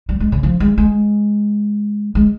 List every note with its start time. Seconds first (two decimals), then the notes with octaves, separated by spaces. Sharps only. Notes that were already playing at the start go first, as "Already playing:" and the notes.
0.09 G3
0.20 G#3
0.32 C#3
0.43 F3
0.60 G#3
0.78 G#3
2.15 G#3